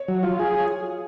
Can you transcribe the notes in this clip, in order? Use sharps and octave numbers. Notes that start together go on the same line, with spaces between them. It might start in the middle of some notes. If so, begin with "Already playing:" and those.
Already playing: C#5
F#3
F4
G#4